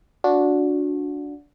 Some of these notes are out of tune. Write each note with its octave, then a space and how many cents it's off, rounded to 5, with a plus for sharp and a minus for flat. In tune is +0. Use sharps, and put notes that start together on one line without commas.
D4 -15 F#4 -25